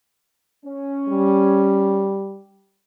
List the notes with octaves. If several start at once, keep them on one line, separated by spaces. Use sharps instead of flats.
C#4
G3